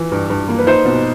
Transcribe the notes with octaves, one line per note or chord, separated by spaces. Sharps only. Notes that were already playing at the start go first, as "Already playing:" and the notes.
Already playing: E3
G2
G2
A#3
B4
D#4 C5
B2